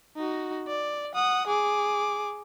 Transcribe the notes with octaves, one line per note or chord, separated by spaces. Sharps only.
D#4 F#4
D5
F#5 D#6
G#4 D6